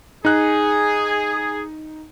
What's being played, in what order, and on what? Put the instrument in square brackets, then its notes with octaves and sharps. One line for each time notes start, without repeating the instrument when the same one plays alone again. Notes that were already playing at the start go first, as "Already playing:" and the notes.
[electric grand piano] D#4 F#6 [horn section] G#4